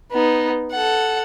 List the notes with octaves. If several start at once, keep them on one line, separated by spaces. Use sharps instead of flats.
B3 D#4
A4 F#5